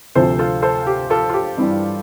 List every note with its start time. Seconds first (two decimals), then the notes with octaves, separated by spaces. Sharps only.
0.15 D2 C3 F3 A4 C5
0.39 F4 A4
0.62 A4 C5
0.87 G4
1.10 F4 A4
1.29 F4
1.34 G4
1.58 G2 E3 G3